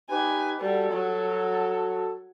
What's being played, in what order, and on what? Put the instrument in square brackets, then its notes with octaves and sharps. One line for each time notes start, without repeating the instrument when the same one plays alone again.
[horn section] D#4 G4 B4 [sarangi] G#5
[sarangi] G3 [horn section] F#4 A4
[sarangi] F#3